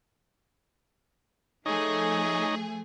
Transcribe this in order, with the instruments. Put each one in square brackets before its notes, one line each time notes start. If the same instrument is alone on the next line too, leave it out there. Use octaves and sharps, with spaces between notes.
[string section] F3 A3 G#4 [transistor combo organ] D#4 C#5 D#5